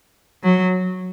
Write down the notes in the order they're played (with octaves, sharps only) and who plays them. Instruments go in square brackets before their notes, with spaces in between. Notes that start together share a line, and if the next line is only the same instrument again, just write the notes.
[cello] F#3